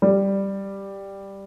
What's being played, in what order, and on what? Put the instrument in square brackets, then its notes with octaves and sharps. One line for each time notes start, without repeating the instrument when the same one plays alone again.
[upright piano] G3